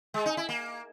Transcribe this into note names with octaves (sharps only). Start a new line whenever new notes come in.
G#3
D#4
E4
A#3